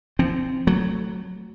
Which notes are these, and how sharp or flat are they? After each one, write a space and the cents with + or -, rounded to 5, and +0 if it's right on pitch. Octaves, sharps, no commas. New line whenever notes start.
F3 -25 C4 +0
F#3 +0 A3 +0